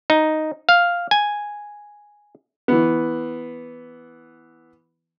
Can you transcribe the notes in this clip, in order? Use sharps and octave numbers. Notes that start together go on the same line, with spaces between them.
D#4
F5
G#5
E3 B3